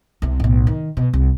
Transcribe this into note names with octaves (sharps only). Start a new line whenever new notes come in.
C2 C3
B1 A2
D#3
B2
C2